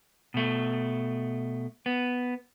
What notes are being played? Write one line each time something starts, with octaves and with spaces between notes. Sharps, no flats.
B2 A3
B3